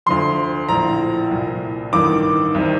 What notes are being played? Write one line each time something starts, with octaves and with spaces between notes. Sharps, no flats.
D2 D3 F3 C6
A#1 A2 F3 A#5
C2 A#2 F3
A1 G2 D#3 D6
C2 C3 D#3